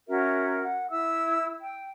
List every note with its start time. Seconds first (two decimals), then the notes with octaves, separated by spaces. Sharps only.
0.07 C#4 F#4 A#4 E5
0.63 F#5
0.91 E4 E5 E6
1.61 G5